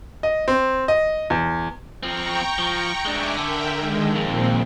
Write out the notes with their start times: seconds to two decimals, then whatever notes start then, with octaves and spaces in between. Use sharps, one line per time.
0.23 D#5
0.48 C4
0.88 D#5
1.30 E2
2.03 F3 C4 G5 A#5 C#6
2.59 F3
3.05 G#3 D4 E5 G#5 D6
3.37 D3 A#4 E5 G5
3.77 D#3 G#3
4.15 F2 A#2 C4